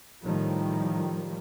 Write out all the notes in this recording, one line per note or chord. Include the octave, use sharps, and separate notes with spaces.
A2 D#3 F3 G3